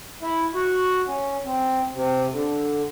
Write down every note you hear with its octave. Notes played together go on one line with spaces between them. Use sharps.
E4
F#4
C#4
C4
C3
D3